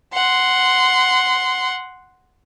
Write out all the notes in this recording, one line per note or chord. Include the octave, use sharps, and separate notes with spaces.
F#5 C6